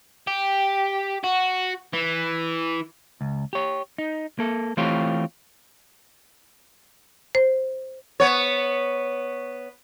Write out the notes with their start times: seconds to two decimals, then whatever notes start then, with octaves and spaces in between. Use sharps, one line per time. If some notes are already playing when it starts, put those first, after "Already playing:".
0.27 G4
1.24 F#4
1.94 E3
3.21 C#2
3.53 G4 C#5
3.98 D#4
4.39 A#3 A4
4.77 E3 A3 C4 F4 G4 C#5
7.35 C5
8.20 B3 C#5